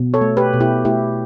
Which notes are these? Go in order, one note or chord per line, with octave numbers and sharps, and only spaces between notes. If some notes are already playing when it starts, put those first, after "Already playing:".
Already playing: B2
A4 C#5
A3
G4 B4
B2
E4 G4
A3 E4 G4